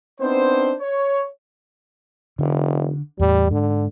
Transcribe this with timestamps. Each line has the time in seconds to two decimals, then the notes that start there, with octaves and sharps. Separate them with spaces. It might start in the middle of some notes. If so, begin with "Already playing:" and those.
0.21 B3 C4 D4 D#4 C5
0.81 C#5
2.39 F1 D3
3.20 E2 A2 G3
3.51 G#2 D3